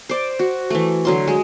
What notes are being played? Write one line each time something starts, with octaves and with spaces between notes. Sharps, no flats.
C5 D5
F#4
E3 A3
D3 F#3 C6
G#3